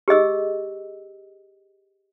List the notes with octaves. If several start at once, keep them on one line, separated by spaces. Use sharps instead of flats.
G4 G#4 D#5 E6